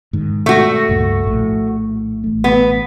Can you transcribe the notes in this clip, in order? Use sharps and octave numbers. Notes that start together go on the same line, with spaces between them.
G#2 D#3
A3 F#4
C#2 G2 A#2
A#1 A2
A1 A3
B3